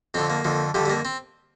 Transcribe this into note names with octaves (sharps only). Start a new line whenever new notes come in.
F2 D3 F3 C4
A#3
F2 D3 F3
F2 D3 F3 G3
G3
A#3
C4